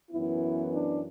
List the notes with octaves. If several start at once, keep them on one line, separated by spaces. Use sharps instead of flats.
F#2 E3 B3 E4
D4